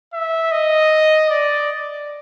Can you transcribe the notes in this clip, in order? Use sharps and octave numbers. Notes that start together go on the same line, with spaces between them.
E5
D#5
D5